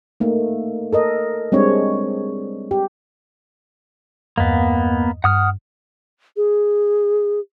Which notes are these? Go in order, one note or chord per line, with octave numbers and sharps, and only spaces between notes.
A3 A#3 D#4
A4 A#4 D#5
G3 G#3 C4 D4 C#5
G4
E2 G2 A#3 B3 D#5
G2 F#5 D#6 F6
G#4